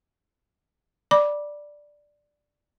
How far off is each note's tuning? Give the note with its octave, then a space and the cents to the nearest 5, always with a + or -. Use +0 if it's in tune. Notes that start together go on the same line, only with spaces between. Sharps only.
D5 +0 B5 -30 D6 +0